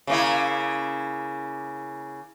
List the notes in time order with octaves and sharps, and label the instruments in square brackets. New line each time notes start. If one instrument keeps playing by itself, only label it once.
[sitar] C#3 A#3 E4